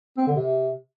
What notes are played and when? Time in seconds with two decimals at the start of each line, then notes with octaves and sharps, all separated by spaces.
0.18 C4
0.27 D3
0.36 C3